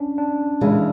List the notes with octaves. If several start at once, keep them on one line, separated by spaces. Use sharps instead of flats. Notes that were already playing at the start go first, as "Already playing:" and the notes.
Already playing: C#4 D4
D4
C#3 E3 G#3